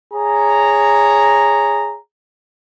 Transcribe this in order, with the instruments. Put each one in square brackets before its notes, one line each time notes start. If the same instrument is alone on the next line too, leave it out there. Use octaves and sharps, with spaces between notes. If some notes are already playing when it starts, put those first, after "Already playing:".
[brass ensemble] G#4 C#5 A#5